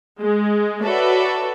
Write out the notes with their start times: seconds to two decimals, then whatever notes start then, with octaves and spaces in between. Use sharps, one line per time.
0.22 G#3
0.84 F#4 A4 B4 C#5 D5 E5